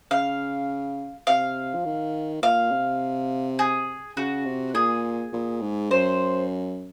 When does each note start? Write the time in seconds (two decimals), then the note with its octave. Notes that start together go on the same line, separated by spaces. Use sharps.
0.11 C#3 F5
1.27 C3 F5
1.75 F3
1.85 D#3
2.42 A#2 F5
2.72 C3
3.59 G#4
4.16 C#3 F#4
4.46 C3
4.75 A#2 G#4
5.33 A#2
5.61 G#2
5.90 F#2 C5